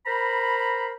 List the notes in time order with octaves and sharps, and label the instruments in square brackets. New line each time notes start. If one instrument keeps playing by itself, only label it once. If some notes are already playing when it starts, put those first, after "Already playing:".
[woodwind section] A#4 C5 A#5 B5